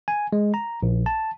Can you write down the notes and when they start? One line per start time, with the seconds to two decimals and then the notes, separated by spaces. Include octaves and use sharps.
0.08 G#5
0.33 G#3
0.54 A#5
0.83 A#1
1.06 A5